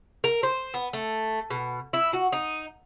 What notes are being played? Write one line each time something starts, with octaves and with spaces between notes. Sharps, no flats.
A#4
C5
B3
A3
B2
E4
F#4
D#4